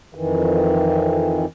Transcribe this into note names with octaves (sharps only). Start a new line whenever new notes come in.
F2 D#3 E3